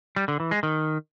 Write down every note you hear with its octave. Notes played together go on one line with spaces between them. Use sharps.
G3
D3
E3
G#3
D#3